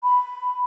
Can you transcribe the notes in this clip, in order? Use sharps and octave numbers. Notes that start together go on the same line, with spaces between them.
B5